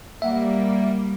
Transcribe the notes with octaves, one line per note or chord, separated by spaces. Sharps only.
G3 A#3 E5 F#5